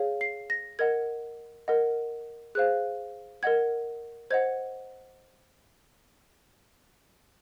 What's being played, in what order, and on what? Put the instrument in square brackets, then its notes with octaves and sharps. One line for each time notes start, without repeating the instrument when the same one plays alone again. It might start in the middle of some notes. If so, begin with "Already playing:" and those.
Already playing: [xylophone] G#4 C#5 F5
C7
A#6
A#4 D#5 F#5 G#6
A#4 D#5 F#5
G#4 C5 F5 F#6
A#4 D#5 F#5 G#6
C5 D#5 F#5 G#6